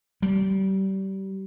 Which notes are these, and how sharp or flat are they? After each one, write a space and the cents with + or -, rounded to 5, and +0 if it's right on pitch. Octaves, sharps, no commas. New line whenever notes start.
G3 -25